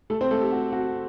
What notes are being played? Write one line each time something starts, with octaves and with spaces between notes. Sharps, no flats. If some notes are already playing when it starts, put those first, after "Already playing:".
A3 A4
C4 C5
A3 A4
G4
F#4
F#4